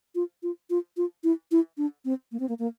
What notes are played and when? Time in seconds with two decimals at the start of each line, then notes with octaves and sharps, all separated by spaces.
0.15 F4
0.43 F4
0.70 F4
0.97 F4
1.24 E4
1.51 E4
1.78 D4
2.05 C4
2.32 A#3
2.40 C4
2.49 A#3
2.59 A#3